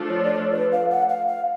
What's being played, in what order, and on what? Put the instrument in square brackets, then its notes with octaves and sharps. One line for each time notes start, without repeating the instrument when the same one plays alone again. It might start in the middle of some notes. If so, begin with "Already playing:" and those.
Already playing: [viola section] F3 A3 D4 F4 A4
[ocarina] C#5
D5
C#5
B4
F5
F#5
F5
F5